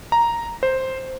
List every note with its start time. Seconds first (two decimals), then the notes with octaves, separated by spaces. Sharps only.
0.12 A#5
0.63 C5